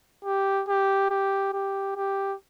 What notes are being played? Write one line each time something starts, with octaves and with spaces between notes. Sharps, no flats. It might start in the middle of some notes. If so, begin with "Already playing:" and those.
G4
G4
G4
G4
G4